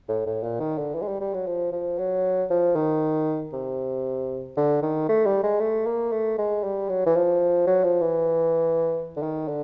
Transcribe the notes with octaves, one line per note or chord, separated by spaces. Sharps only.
A2
A2
A#2
D#3
D3
E3
G#3
G3
G3
F#3
F3
F3
F#3
F3
D#3
C3
D3
D#3
A3
G3
G#3
A3
A#3
A3
G#3
G3
F#3
E3
F3
F#3
F3
E3
D3
D#3
D3